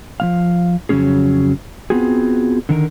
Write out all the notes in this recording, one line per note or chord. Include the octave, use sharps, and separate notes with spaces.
F3 G#3 F5
F2 C#3 F#3 A3 C#4 G#4
B3 C4 F4 F#4 G#4
D3 D#3 A#4